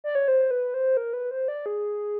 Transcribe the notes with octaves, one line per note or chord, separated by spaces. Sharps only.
D5
C#5
C5
B4
C5
A#4
B4
C5
D5
G#4